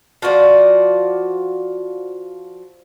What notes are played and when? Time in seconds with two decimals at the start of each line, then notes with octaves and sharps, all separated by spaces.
0.22 F3 F#4 C5 D5